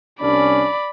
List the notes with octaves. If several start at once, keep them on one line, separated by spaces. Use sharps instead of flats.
C2 C#4 D4 D5 B5